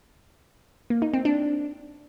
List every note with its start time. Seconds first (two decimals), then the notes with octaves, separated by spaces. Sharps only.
0.90 A#3
1.02 D#4
1.14 C4
1.25 D4